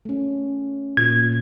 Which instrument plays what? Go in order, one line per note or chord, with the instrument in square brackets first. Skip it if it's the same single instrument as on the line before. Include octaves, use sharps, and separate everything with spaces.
[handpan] A3 C#4
[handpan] A#2 [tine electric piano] G#6